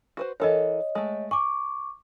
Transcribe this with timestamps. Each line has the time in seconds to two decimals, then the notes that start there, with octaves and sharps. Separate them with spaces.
0.17 F#4 B4 C5
0.40 E3 A4 A#4 C#5 D#5
0.95 G#3 A3
1.31 G#5 C#6 D6